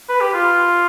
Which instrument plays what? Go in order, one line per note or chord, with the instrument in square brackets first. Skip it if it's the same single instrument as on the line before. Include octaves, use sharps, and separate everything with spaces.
[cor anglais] B4
G4
F4